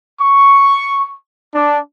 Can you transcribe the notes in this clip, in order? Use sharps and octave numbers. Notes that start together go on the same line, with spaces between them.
C#6
D4